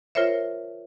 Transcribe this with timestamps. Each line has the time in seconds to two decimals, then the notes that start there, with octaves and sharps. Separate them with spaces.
0.15 F4 A#4 C5 C#5 E5